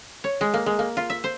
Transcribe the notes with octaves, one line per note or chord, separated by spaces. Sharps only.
C#5
G#3
A#3
G#3
A#3
F4
E5
C5